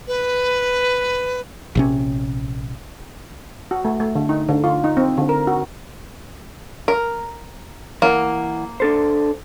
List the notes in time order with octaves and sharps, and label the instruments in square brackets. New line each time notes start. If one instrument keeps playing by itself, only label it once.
[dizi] B4
[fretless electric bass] A#1 C3 C#4
[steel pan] F#4
A3
A3
D3
D#4
D3
F4
D#4
C4
D3
A#4
F#4
[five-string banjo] A#4
[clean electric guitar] E3 F#5 [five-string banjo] A#3
[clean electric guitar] D4 A4 C5